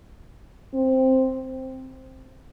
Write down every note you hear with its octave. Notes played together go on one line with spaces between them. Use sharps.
C4